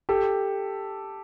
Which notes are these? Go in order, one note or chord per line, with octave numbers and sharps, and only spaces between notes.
G4 A4